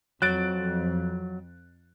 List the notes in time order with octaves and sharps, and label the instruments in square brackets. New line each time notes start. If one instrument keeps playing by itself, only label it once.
[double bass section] F2 [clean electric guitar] F#3 [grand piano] F#6 A6 D7